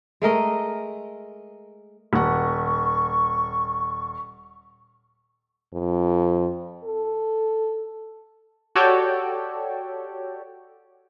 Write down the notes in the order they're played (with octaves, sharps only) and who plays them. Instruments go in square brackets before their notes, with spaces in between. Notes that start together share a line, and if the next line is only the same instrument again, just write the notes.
[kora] G#3 A3 A#4 D#5
[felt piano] D#1 F#5 [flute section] C#6
[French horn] F2
A4
[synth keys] F#4 G4 A4 C#5 D5 G5